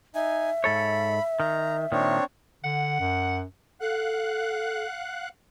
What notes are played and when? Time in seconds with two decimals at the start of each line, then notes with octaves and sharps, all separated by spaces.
0.15 D#4 E5 G#5
0.64 G#2 A4 C#5 B5
1.40 D#3 A#5
1.92 A#2 D#3 C4 D4 C#5
2.64 D3 F#5
3.00 F#2
3.81 A4 F5 F#5 F#6